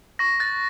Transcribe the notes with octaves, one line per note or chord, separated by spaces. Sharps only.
C#6 A#6
F#6 A6